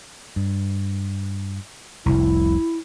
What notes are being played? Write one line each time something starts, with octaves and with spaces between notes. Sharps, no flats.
G2
F1 C2 E4